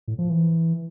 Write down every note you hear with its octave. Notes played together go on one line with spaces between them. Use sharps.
A2
F3
E3